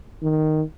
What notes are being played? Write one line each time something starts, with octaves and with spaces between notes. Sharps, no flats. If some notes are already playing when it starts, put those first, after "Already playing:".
D#3